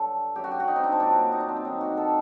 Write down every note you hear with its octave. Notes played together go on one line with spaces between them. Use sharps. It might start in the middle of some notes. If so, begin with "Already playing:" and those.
Already playing: G2 D3 F#3 A4
F#2 F#3 G4
F#4
G4
F#4
D#4
C4
D4
C4
A#2 F#3 D4
D#4
D4
C4
D4
G2 D#3 F#3 D#4
F#4
A4